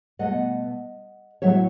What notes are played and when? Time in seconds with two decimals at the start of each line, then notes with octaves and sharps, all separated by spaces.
0.19 B2 A3 D#5 F#5
1.42 A2 F#3 A3 C#5 E5